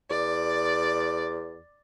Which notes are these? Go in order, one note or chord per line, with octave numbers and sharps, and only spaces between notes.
E2 D5